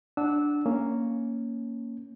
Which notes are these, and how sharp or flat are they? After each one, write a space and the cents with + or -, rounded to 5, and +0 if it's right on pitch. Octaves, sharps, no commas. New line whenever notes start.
D4 +0 F#5 +0 E6 -20
A#3 -5 C#4 +0